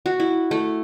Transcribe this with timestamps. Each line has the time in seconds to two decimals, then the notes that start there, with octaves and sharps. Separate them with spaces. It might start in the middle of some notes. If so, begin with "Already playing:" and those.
0.06 F#4
0.20 E4
0.51 A3